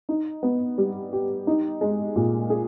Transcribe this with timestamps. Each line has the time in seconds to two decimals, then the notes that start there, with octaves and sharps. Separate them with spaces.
0.09 D#4
0.43 B3
0.78 G3
1.13 G4
1.47 D#4
1.81 G#3
2.16 A#2
2.50 G#4